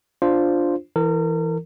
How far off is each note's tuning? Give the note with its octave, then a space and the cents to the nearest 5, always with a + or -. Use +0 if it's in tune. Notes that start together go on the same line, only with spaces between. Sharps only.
D4 +0 F4 +0 C5 +0
E3 +0 A#4 -35